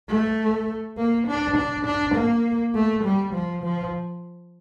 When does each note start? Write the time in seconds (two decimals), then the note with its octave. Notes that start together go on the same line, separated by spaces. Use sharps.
0.09 A3
0.97 A#3
1.27 D4
1.56 D4
1.86 D4
2.15 A#3
2.75 A3
3.04 G3
3.34 F3
3.63 F3